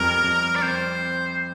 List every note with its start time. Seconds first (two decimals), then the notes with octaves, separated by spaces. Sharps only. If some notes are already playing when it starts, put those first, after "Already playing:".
Already playing: F2 G3 A#4
0.24 F2
0.55 D5
0.62 C4 C5